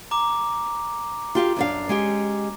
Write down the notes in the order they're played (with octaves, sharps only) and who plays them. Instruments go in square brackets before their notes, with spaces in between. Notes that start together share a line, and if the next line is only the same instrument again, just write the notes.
[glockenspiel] A#5 D6
[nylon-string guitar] F4 G4 F5
F#2 D4 F5
G#3 C#4 G4